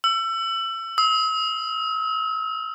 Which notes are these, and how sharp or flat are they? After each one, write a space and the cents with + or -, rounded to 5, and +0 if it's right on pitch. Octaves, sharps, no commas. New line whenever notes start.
E6 +25
E6 -45